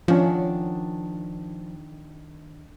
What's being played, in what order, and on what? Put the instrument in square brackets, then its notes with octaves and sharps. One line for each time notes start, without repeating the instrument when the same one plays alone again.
[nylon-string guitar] D#3 D4 F#5 [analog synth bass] F3 [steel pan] C#4 F4